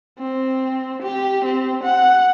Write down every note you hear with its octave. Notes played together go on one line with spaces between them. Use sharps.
C4
G4
C4
F#5